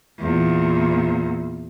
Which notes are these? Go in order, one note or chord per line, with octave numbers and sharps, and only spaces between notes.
E2 A#2